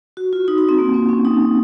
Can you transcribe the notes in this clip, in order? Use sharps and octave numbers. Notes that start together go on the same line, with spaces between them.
F#4
F4
D#4
D#4
C4
A#3
C4
C#4
D#4